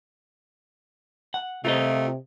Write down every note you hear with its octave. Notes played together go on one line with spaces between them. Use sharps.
F#5
C3 A3 F4 A#4 D#5